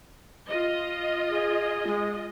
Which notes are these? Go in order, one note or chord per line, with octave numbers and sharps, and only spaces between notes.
F4 D#5
G#4
G#3